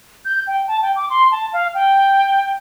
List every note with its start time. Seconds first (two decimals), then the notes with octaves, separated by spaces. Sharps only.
0.25 G6
0.47 G5
0.68 A5
0.82 G5
0.96 D6
1.10 C6
1.32 A5
1.53 F5
1.74 G5